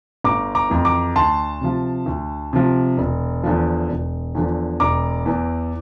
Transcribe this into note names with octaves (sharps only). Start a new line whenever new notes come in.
G1 A#5 D6
A#5 D6
F2 E3
A#5 D6
D2 A5 C6
C3 F3
D2
C3 F3
E1
E2 D3 F3
E1
E2 D3 F3
E1 A#5 D6
E2 E3